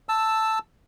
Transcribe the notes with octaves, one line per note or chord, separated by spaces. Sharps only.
A5 E6